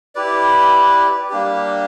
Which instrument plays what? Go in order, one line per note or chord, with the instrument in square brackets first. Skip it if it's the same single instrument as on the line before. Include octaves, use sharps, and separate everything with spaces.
[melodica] E4 G4 B4 D5
G3 A#3 D4 G4